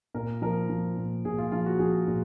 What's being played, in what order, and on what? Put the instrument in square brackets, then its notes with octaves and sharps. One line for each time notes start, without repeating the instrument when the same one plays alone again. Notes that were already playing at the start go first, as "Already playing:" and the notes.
[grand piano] A#2 A#4
F3 A#4
F3
A#2
A#2 G#4
F4
F3 F4
F#4
F3 G#4
A#2